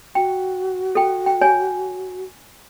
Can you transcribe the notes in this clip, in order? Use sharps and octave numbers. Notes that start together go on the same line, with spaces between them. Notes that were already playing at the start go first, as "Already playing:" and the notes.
F#4 G5
A4 G5
G5
C#5 G#5